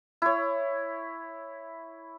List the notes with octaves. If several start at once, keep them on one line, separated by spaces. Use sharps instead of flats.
E4 C#5